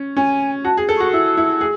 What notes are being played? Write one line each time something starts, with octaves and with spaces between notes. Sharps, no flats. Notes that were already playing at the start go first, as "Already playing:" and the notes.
Already playing: C#4
C#4 G#5
F#4 A5
G#4
A4
F#4 C#6
E4 E6
E4
G#4